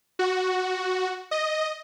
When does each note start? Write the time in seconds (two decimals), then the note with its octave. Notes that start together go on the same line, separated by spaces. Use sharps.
0.19 F#4
1.31 D#5